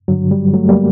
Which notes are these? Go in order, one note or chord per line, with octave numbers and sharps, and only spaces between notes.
G2 D3 F#3
G3
F#3 A3
G3 A#3